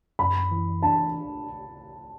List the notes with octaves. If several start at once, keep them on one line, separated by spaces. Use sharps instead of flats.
F#2 B5
E3
D4 A5